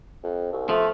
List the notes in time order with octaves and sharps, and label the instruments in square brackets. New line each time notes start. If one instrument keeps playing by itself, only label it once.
[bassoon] F2
C2
[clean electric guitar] F3 [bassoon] A3